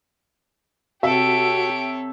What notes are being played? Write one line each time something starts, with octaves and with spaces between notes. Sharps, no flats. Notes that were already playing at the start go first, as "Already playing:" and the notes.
C3 F#4 G4 A4 C#5 E5 D7